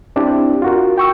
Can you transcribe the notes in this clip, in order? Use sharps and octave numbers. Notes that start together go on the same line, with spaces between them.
C4 D4 E4 G4
F4 F#4 A#4
G5 C#6 E6